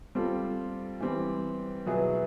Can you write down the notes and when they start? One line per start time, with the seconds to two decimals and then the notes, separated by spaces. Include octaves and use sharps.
0.15 G3 C4 F4 A4
1.00 E3 G3 C4
1.86 B2 F#3 B3 E4 G#4